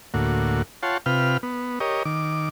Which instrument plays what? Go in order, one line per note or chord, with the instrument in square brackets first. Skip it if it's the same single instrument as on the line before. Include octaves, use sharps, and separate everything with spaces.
[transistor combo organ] D2 A2 A#3 F#4
F4 C#5 F#5 G5 A5 C6
C3 F4 B4 G5 F6
B3
G4 A#4 C#5 D#5
D#3 D6